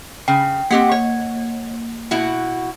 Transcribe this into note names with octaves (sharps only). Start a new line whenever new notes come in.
C#3 G5
A#3 C4 G4 F#5
C#5
B2 E4 F#4